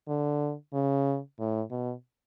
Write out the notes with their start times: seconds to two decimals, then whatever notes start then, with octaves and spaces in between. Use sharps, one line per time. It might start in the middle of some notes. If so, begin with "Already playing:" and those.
0.08 D3
0.73 C#3
1.39 A2
1.71 B2